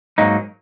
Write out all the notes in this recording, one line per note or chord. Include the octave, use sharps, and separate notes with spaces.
G#2 F#3 A#3 D#4